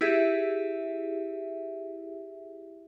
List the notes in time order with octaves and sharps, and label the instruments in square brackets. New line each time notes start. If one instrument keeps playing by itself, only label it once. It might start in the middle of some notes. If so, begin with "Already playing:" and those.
[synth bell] E4 G4 G#4 E5